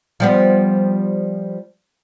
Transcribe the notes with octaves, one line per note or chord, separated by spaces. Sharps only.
F3 G3 B3